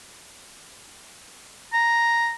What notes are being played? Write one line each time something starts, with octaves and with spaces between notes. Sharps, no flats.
A#5